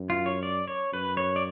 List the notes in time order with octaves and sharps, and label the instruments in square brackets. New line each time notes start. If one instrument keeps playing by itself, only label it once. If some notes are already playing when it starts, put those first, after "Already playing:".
Already playing: [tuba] F#2
[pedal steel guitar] F4
C#5
D5
C#5
[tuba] F#2 [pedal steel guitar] B4
[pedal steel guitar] C#5
D5